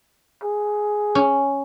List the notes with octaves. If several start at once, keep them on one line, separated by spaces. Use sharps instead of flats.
G#4
C#4